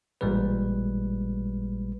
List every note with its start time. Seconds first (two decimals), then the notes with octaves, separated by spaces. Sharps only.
0.21 A1 A#2 G3 G#3 B4